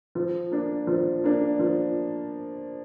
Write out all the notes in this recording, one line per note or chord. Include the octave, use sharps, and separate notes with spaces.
F3
A#3 D4
F3
A#3 D4
F3